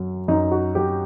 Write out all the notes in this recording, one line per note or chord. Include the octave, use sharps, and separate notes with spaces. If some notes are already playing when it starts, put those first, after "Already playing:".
Already playing: F#2 F#3
F#2 D#4
F#4
F#3 G4